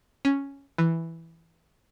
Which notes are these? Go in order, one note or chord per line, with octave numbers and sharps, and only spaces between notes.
C#4
E3